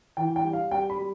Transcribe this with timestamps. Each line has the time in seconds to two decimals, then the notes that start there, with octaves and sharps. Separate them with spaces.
0.17 E3 G5
0.36 G5
0.44 G3
0.53 F5
0.71 G3 G5
0.90 B5
0.99 G3